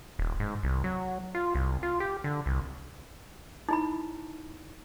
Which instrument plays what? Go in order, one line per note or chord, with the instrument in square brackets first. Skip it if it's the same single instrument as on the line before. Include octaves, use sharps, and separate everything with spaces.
[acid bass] D#1
G#2
C2
F#3
F4
C2
F4
G4
D3
C2
[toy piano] D#4 E4 B5